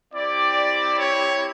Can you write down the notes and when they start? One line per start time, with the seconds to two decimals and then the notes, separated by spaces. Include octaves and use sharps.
0.13 C4 E4 G4 D5
0.98 C#5